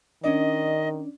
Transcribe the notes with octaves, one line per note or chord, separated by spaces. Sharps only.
D#3 C#4 D4 D5 D#5